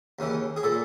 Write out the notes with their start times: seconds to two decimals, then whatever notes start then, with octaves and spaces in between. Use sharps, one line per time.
0.19 D#2 C#3 E3
0.56 G#4
0.63 A#2 A4